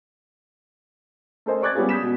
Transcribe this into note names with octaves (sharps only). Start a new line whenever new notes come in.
A3 A4 A#4 C5 D#5 G#5
D5 C#6 D6 F#6 G#6 A6
G3 B3 C#4 F4 G4 G#4
D#6 G6 B6 E7
B2